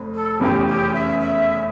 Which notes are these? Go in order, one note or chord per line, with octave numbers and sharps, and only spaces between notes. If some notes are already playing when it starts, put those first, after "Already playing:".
Already playing: F1 F2
A4
F1 E2 C#3 E3 G4
G4
E5
E5